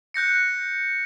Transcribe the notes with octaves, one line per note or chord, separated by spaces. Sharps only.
F#6 G6 A#6 C#7